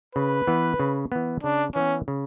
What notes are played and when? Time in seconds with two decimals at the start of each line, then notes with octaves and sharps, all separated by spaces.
0.15 C#3 B4
0.47 E3 B3
0.80 C#3
1.12 E3 B3
1.43 C#3 D4
1.75 E3 B3 C#4
2.08 C#3